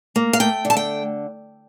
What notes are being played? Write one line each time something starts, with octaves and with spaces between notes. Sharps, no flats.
A#3
F5
A3 G5
D3
A5
G5